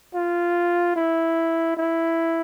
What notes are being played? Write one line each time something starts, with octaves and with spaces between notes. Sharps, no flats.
F4
E4
E4